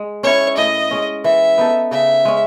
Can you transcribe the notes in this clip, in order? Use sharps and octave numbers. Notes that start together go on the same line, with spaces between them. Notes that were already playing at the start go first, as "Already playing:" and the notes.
Already playing: G#3
C#4 E4 C#5
A2 D#5
G#3 C#4
E3 E5
B3 D#4 A4
C#3 E5
G#3 C#4